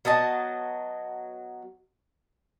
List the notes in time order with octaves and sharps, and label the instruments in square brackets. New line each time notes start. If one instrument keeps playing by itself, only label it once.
[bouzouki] F#3 B3 D#5 A5